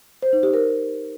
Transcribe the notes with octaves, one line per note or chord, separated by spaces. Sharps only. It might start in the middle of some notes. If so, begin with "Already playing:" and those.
C5
D#4
G4
A#4